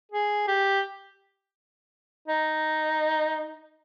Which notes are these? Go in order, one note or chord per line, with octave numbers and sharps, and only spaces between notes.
G#4
G4
D#4